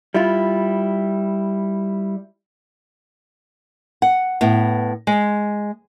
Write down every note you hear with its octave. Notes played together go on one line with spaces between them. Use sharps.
G3 E4 F4
F#5
A2 B3
G#3